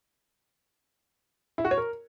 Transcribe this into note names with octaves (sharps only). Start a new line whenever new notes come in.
E4
F#4
C#5
A#4